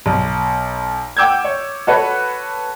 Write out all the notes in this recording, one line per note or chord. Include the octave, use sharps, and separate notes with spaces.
B1
F#5 G5 D6 E6 G6 G#6
C#5
F#4 A4 B4 C#5